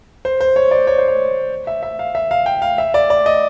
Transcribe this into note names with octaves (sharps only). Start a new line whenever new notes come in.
C5
C5
C#5
D5
C#5
C5
C#5
E5
E5
F5
E5
F5
G5
F5
E5
D5
D5
D#5